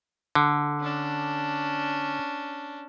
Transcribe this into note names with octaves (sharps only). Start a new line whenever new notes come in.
D3
C#4 D4